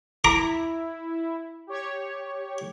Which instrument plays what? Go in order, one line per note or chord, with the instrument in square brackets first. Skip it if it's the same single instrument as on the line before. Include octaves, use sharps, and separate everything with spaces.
[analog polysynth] E4 [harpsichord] A#5 D6
[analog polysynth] G4 C#5